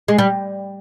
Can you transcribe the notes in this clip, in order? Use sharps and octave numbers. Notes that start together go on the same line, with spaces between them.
G#3
G3